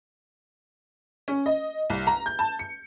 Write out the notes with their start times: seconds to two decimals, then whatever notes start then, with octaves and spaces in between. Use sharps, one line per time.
1.28 C#4
1.46 D#5
1.90 C2
2.07 A#5
2.26 G6
2.39 A5
2.59 C#7